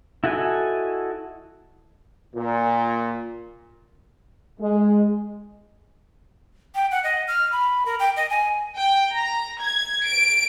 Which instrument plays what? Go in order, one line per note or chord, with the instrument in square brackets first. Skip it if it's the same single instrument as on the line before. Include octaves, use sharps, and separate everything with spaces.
[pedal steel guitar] E4 F#4 A4 D#5 G#5
[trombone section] A#2
[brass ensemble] G#3
[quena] G5
F#5
D#5
F6
B5
A#4
G5
D#5
G#5
[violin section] G5
A#5
G#6
D7